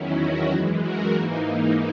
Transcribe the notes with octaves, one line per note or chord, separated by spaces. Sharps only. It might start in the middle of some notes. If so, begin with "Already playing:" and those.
Already playing: E2 D#3 F#3 C#4 E4
F#4
F#2 E3 G#3
F#4 A#4
G#2 E3 A#3 D#4